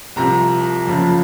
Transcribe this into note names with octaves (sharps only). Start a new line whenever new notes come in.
C2 C3 F3 C4 A#5
F#1 F2 C#3 F3